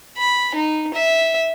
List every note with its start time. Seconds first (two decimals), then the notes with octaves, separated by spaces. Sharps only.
0.18 B5
0.55 D#4
0.94 E5